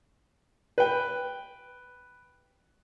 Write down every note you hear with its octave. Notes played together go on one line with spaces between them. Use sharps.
B4 G5